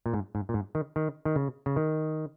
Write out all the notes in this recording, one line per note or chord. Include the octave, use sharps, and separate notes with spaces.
A#2
G#2
G#2
A#2
G#2
D#3
D#3
D#3
C#3
C#3
D#3